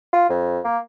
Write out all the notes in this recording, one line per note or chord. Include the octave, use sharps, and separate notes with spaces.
F4
F2
A#3